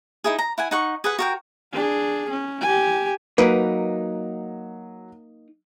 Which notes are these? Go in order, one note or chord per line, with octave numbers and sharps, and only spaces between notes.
D#4 E4 G#4
A#5
E4 F#5 G#5
D#4 F#5 C#6
G#4 B4 F#5
F#4 A#4 G5
D4 G#4
C#4
G4 G#5
F#3 A#3 D#4 B4